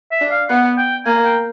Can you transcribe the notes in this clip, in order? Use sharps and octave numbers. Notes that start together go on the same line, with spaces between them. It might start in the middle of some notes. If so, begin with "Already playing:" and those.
E5
D4
F5
B3 F#5
G5
A#3 G#5
G5